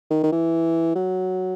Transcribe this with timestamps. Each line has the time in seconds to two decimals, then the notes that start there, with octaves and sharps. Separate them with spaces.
0.10 D#3
0.23 D#3
0.32 E3
0.95 F#3